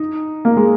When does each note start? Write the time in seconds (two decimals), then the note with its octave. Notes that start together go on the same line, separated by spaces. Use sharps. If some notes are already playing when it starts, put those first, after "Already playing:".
Already playing: D#4
0.45 A#3
0.57 G#3